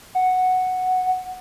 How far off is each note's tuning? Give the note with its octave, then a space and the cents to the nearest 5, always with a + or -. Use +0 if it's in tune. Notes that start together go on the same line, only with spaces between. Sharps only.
F#5 +0